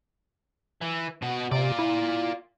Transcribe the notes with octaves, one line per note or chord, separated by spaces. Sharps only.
E3
B2 F#4
C3 F4 D5
E4